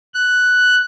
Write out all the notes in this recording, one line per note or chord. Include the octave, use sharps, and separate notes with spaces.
F#6